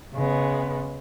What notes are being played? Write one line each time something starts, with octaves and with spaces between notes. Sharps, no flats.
C#3 G#3 B3